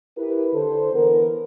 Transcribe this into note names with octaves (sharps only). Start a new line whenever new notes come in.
E4 G4 A#4 B4
D3 A4 C5
D3 E3 B3 A#4